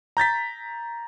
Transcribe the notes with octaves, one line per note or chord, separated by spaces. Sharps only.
A#5 G6 A6 B6